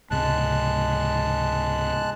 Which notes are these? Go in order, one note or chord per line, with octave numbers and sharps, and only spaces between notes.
C#2 G#2 C3 G#3 A5 F#6